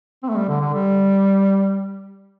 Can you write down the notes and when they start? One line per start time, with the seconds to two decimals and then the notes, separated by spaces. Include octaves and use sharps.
0.23 C4
0.29 A3
0.36 G3
0.49 D3
0.60 D3
0.74 G3